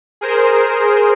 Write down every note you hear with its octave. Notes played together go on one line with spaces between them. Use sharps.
G#4 A#4 C5